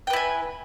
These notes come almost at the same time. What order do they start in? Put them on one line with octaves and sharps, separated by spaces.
G5 B4 E4 G#5